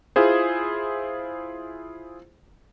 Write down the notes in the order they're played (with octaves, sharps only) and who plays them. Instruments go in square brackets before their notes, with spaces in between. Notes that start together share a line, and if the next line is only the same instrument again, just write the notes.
[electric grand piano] E4 F4 G#4 C5